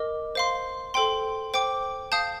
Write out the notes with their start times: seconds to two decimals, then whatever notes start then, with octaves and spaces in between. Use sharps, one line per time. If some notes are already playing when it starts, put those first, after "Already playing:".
Already playing: A#4 D#5 D6
0.35 C5 F5 C6
0.94 A4 C5 G5 C6
1.54 C5 G5 D6
2.12 F5 A5 D#6 G6